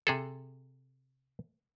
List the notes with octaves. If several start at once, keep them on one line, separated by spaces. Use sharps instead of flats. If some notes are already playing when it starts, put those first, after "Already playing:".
C3 G#4 A4